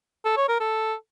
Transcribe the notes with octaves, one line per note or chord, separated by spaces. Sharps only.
A4
C#5
A#4
A4